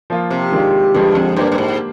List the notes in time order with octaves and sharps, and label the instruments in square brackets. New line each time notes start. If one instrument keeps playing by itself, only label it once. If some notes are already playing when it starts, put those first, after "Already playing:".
[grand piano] F3 A#3 F4
[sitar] C3
[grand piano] D#3 G#3 D4 F4
[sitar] G2 [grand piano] D3 F3 G#3
[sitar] F2
[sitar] G2 [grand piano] A#3 D4 G4 C5
[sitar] G2
G#2